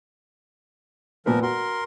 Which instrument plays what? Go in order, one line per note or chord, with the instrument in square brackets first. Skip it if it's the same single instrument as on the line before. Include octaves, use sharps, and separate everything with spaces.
[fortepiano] A#2 B3 B4 [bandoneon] F3 A#4
[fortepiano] F#4 [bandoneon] A#4 C6